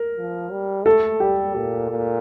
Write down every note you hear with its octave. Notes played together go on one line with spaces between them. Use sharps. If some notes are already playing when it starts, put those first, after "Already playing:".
Already playing: A#4
F3
G3
A3 A4
G3 G4
A#2
A#2